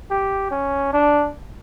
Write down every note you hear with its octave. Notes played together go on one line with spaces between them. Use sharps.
G4
C#4
D4